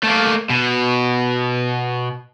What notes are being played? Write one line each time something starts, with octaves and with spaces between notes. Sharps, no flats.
A3 A#3
B2